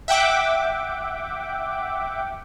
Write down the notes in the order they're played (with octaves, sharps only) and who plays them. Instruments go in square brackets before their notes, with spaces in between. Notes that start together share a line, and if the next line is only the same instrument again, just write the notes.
[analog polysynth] E5 F#5 G5 D6